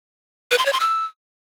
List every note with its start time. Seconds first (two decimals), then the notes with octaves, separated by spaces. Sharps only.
0.51 B4
0.58 C6
0.66 C#5
0.73 C6
0.80 E6